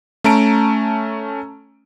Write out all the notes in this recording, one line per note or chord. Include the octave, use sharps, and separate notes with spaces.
A3 C#4 A5 A#5 D7